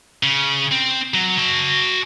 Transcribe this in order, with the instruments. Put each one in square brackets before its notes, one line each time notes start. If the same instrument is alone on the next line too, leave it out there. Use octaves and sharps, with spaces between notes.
[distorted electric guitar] C#3
C4
F#3
F#4 A5